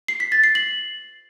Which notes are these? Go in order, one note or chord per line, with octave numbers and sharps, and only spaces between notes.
C7
B6
A6
C7
F#7